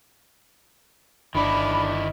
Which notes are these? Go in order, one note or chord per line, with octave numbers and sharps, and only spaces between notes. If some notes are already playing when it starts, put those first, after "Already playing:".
G1 D#3 D4 E4 B5